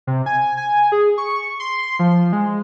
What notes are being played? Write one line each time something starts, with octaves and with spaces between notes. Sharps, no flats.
C3
G#5
G#5
G#4
C#6
C6
F3
G#3